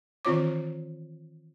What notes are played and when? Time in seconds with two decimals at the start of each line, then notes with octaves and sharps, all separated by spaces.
0.25 D#3 E3 C4 F4 C#5 D6